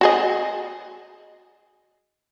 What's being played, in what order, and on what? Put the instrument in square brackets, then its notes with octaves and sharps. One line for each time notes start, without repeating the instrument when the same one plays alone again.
[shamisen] F#4 G#4 D#5